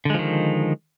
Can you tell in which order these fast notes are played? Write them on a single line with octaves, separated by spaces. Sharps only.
D3 G#3 F3 D#3